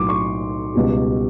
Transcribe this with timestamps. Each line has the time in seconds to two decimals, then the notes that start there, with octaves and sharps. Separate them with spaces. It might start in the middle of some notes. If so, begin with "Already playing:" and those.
Already playing: B1 A2 F#3 C6 D6
0.09 C#6
0.75 C#2 B2 G3